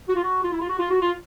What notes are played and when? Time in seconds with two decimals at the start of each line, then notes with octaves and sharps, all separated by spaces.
0.08 F#4
0.16 F4
0.23 F#4
0.44 F4
0.53 E4
0.61 F4
0.69 F#4
0.79 F4
0.91 F#4
1.02 F4